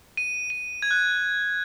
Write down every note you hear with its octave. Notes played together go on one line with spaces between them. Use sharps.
D#7
D#7
G#6
F#6